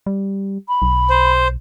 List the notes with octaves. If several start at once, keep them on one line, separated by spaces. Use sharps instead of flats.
G3
B5
B1
C5